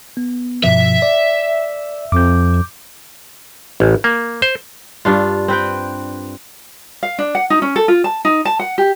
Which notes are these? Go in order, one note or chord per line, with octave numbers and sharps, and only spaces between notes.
B3
G2 B2 F3 E5
D5
F2 D6 G6
A1
A#3
C5
G2 D4 F4
C4 B4 G5
F5
D4
F#5
D#4
C#4
A4
F4
A5
D#4
A5
F#5
G4